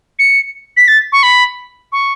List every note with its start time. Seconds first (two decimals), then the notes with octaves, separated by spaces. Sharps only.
0.19 C#7
0.77 B6
0.88 A6
1.12 C#6
1.23 B5
1.92 C#6